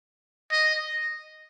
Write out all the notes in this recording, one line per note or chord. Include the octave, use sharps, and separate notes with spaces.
D#5